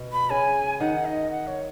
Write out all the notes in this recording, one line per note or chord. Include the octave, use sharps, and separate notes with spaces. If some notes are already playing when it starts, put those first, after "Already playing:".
Already playing: B2
B5
C#3 G#5
D#3 F#5
D#5
F#5
C#5